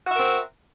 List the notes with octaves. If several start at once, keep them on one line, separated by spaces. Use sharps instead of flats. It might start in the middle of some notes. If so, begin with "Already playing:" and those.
C4 F#4 A#4 E5